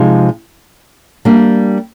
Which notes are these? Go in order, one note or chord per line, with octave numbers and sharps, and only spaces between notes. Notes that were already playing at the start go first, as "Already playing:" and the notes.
Already playing: C3 F3 G#3 C4 D#4
G3 A#3 D4